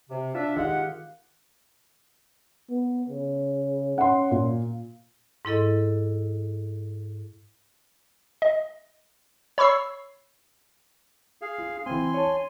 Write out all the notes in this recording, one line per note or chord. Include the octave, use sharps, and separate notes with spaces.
C3
D4 F4 E5
D#3 G#3 G4 F5 F#5
B3
C#3
C#4 F#5 C6
A#2
G#2 E4 A4 D#5
D#5
C#5 B5 C#6 E6 C7
G#4 F5
F4
E3 C4 G#5 C6
C#5 A5